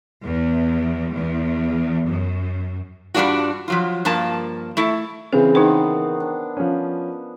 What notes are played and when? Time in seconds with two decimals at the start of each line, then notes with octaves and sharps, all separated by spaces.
0.25 E2
1.14 E2
2.08 F#2
3.14 G2 G3 C4 D4 F4 F#4
3.68 F3 F#3 F4
4.05 G2 F3 A#3 A5
4.77 A3 E4 A4
5.33 C#3 E3 C4 G#4
5.55 D#3 B3 D#4 B4 C5
6.20 D4
6.57 F3 C#4